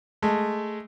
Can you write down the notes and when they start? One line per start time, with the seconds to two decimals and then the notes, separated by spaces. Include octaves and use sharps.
0.22 G#3 A3